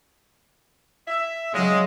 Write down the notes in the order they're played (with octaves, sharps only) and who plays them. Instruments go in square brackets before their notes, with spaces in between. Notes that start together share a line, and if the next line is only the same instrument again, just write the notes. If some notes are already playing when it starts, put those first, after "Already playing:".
[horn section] E5
[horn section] C#3 G#3 [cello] F#3